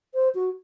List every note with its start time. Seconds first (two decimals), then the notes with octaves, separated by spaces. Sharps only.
0.14 C5
0.35 F#4